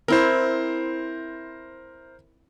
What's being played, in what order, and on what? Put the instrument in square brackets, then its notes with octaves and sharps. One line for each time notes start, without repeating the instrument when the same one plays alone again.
[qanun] C4 E4 [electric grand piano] A#4 C5